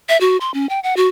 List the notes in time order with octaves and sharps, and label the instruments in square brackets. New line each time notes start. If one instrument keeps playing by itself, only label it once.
[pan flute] E5
F#4
C6
C#4
G5
F#5
F#4